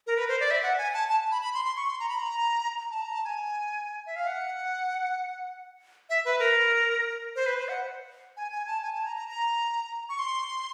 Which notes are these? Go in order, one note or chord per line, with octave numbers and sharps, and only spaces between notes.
A#4
B4
C5
D5
E5
F#5
G#5
A5
A5
B5
B5
C6
C6
C#6
C6
A#5
B5
A#5
A5
A#5
A5
G#5
E5
F5
F#5
E5
B4
A#4
C5
B4
C5
F#5
G#5
G#5
A5
G#5
A5
A#5
A#5
A#5
C#6
C6